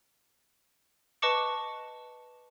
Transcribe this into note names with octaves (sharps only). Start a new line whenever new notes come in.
B4 D#5 A5 C#6 D6 C#7